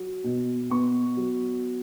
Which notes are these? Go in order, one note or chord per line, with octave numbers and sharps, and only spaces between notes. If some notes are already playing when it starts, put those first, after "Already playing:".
Already playing: F#3
B2
B3 C#6
F#3